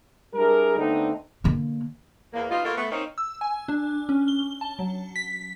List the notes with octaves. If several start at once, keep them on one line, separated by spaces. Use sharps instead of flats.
G3 D4 E4 G#4 A#4
D3 A3 B3 C4 D4 D#4
D3 A#3
E2 A#3
B2 G3 D#4 F4
A#3 B3 F4 F#4 A4 A#4
A3 B3
A#3 C4 C#4 D#4
E6
G#5
D4
C#4
G7
A5
F#3
B6